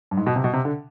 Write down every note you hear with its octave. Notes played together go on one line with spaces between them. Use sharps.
G2
G#2
B2
C3
B2
C3
D3